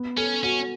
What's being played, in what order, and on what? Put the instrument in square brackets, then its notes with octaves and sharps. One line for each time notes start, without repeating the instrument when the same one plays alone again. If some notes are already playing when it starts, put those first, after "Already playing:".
Already playing: [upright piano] B3
[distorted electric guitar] C#4 [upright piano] A4
[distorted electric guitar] C#4 [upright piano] F#4